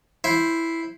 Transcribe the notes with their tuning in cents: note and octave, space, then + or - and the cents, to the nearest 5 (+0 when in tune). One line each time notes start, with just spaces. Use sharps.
E4 +0 C5 +0